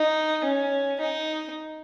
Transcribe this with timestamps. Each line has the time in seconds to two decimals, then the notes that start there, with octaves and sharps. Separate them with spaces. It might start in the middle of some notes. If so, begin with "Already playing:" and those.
Already playing: D#4
0.44 C#4
1.00 D#4